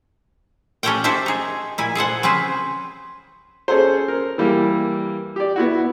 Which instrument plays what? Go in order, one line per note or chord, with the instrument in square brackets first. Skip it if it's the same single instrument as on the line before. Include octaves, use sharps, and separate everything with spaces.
[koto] C#4 G4 A4 C#5 F#5 G5
F#4 G4 A4 C5 E5
D#4 G#4
A#2 E4 G#5
G#4 A4 C5 F#5
C#3 C4 G#4 B4 C5
[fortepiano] C#4 G#4 A4 C5
A#4
E3 G3 A#3
G4 D5
B3 E4 F#4